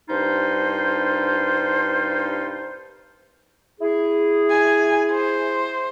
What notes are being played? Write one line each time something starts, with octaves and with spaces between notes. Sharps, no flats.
C2 G2 D4 D#4 F4 C5
E4 G#4
G#5
C5